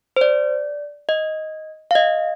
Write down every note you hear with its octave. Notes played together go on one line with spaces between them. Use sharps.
C5
D5
D#5
F5
D#5